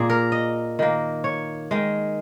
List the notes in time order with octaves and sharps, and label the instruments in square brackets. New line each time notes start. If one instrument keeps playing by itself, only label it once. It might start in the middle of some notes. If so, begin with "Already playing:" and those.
Already playing: [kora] A#2 A#3 G#4
A#4
D#5
D#3 A#3
C#5
D#3 G#3